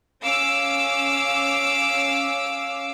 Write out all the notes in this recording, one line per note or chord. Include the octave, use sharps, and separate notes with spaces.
C#4 F5 D6 E6